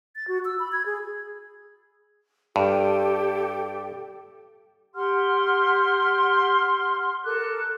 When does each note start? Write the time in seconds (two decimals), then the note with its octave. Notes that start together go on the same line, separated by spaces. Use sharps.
0.16 A6
0.28 F#4
0.45 E6
0.59 B5
0.72 G#6
0.86 G#4
2.56 G2 G4 A4 G5
4.94 G4 F#5 C6 F6
7.24 A4 A#4 D6 F#6